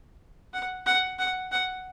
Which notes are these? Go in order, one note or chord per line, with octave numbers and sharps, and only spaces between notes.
F#5
F#5
F#5
F#5